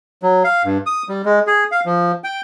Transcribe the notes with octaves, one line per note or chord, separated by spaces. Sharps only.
F#3
F5
G2
D#6
G3
G#3
G#4
F5
F3
G5